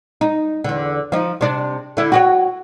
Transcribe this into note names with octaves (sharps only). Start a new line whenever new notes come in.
D#4
E2 D3
F3 D#4
C3 D4
D3 E4
F#4 G4 C#5